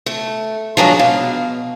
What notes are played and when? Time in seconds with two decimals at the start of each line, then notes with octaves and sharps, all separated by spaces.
0.06 A3
0.77 F3 F#3 G#3 D4
0.99 B2 F5